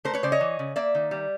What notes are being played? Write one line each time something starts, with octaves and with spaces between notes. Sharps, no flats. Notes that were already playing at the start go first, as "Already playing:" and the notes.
A3 A#4 C5
B4 C#5
C#3 C5 D5
C#5 D#5
E3
C#3
A#3 D5 E5
D#3
G3